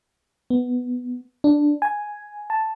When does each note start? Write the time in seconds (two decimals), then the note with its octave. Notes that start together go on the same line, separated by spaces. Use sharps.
0.50 B3
1.44 D4
1.82 G#5
2.50 A5